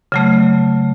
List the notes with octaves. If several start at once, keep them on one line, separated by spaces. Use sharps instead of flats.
C#3 F#3 A3